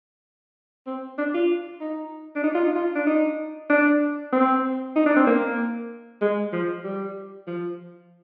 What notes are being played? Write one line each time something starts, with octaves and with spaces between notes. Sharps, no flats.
C4
D4
F4
D#4
D4
D#4
F4
D#4
F4
D4
D#4
D4
C4
D#4
D4
C4
A#3
G#3
F3
G3
F3